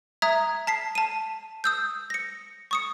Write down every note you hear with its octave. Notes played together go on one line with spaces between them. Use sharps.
E5 A#5 D#6 G#6
A5 B6 C7
A5 D#7
D#6 E6 G6
A#6 C#7
C#6 D#6 C#7